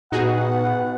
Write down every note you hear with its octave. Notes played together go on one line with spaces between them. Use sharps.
A#2 B3 D#4 F#4 G#4 F#5